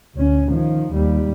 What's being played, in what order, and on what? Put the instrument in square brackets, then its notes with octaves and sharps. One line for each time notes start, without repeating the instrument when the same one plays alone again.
[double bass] D2 C#4
D#3 F3
D#2 G3